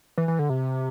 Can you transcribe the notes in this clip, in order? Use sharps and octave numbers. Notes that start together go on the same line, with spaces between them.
E3
E3
D3
C3